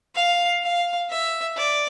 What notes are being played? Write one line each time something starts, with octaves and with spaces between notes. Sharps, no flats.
F5
F5
E5
D5